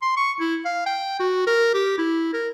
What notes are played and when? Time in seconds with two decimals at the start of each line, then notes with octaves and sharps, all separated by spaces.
0.02 C6
0.17 C#6
0.40 E4
0.65 F5
0.86 G5
1.20 F#4
1.47 A#4
1.74 G4
1.98 E4
2.34 A#4